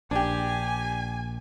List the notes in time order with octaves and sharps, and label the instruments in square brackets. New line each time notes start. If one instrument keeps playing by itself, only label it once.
[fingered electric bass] A#1 [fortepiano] D4 G4 [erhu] G#5